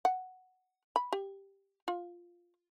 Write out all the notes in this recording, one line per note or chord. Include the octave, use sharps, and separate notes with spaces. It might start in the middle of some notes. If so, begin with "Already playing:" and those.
F#5
B5
G4
F4